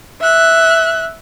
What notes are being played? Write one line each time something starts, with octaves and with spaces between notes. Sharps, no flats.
E5 F#6